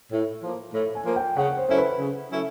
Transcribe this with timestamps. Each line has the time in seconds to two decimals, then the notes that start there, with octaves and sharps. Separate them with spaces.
0.12 A2
0.43 F3 A#3
0.74 A2
0.95 G#5
1.06 F3 A#3
1.16 G5
1.37 C#3 F#5
1.57 C5
1.68 F#3 A3 C#4 E4 C5
1.78 B4
1.99 C#3
2.30 F#3 A3 C#4 E4